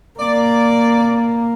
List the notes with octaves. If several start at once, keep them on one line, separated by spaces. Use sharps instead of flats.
A#3 D5